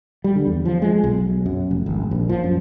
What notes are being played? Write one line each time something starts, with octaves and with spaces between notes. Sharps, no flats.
G3
D3
E2
F3
G#3
B1
F#2
F1
G#1
A#1
F3
F#2